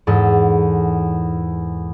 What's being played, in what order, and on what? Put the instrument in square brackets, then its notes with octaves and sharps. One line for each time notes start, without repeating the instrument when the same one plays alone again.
[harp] E2 G#2 A4